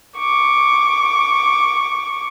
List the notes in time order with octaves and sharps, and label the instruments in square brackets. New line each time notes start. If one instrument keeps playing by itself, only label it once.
[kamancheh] C#6 D6